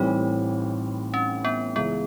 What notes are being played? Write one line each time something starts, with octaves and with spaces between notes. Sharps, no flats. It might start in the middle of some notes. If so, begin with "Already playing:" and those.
Already playing: A1 A2 E3 G3 C4 D#4
C#4
B3
C#2 C#3 E3 G#3 B3